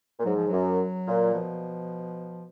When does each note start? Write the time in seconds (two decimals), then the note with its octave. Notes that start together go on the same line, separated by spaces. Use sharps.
0.19 A#2
0.25 G#2 F#3
0.36 F3
0.48 F#2 F#3
1.07 A#2
1.34 B2 F3